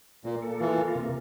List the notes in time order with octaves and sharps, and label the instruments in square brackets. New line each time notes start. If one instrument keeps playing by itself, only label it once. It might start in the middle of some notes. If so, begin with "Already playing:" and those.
[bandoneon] A#2 [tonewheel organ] A#3
[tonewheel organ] A4
[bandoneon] E3 [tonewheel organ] F4
[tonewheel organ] A#3
C3